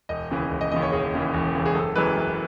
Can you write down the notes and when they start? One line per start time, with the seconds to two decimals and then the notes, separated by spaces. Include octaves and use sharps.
0.09 E1 D#5
0.31 D#2 C#3 E3
0.51 E1
0.61 D#5
0.72 D#2 C#3 E3 D#5
0.82 C#5
0.92 E1 G#4
1.13 D#2 C#3 E3
1.34 E1
1.54 D#2 C#3 E3
1.66 G#4
1.74 F#1 A4
1.96 F#2 E3 G#3 B4
2.16 F#1